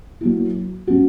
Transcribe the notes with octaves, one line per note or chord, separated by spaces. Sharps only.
F#3 A#3 E4
F#3 C#4 F#4